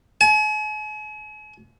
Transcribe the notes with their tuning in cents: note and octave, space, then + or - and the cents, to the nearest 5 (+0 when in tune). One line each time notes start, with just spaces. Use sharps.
G#5 +45